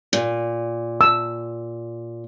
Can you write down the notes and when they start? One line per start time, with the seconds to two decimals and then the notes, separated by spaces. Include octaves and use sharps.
0.13 A#2
1.01 E6